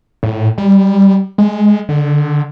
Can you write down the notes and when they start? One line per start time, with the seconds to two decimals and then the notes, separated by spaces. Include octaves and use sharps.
0.23 A2
0.58 G3
1.38 G#3
1.89 D3